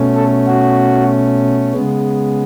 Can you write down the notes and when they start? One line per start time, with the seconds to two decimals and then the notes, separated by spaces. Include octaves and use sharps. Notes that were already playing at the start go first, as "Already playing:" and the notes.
Already playing: B2 A3 C#4
0.15 A4
0.47 F#4
1.73 C#3 G#3 B3